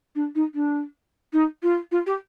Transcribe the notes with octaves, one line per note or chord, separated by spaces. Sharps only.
D4
D#4
D4
D#4
F4
F4
G4